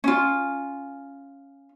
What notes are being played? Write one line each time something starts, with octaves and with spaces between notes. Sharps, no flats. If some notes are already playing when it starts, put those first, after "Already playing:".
C#4 F4